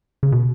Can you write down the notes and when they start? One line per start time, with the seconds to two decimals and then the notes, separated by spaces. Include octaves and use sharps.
0.23 C#3
0.32 B2